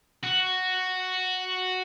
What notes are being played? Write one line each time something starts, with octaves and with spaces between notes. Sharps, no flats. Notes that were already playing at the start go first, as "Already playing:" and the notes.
F#4